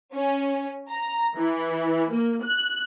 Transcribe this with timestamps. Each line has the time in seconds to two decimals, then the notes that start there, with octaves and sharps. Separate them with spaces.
0.14 C#4
0.90 A#5
1.36 E3
2.11 A#3
2.43 F#6